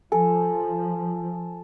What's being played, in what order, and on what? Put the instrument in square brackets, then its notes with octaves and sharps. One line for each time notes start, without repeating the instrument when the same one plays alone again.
[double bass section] F3 [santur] A4 [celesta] G#5